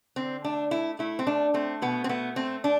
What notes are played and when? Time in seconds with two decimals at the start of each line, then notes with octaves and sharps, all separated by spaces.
0.16 D3 C4
0.44 A3 D4
0.71 A3 E4
0.99 A3 E4
1.19 C4
1.27 A3 D4
1.54 A3 C4
1.82 B2 B3
2.04 C4
2.09 A3 B3
2.36 A3 C4
2.64 D4